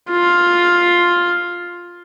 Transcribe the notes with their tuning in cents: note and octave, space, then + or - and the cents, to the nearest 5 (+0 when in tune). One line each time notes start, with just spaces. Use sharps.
F4 +5